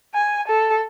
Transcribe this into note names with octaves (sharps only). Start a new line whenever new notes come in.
G#5
A4